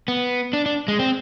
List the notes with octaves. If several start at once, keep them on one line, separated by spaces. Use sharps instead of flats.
B3
D4
D4
G#3
C4